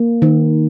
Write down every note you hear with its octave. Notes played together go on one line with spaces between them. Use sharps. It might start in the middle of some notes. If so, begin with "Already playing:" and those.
Already playing: A#3
D#3